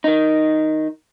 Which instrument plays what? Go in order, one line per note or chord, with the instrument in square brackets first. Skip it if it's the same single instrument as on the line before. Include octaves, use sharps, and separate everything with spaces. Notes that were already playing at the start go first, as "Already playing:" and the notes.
[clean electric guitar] D#3 D#4